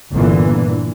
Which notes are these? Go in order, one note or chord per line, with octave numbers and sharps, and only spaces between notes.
G1 A#2 D3 E3